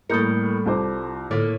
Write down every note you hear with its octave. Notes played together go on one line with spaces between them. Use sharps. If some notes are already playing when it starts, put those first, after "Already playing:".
A2 G3 A#3 A4 A#4 D#6 G6 C#7
C2 F4 C5 A5 D6
A2 D3 A#3 D5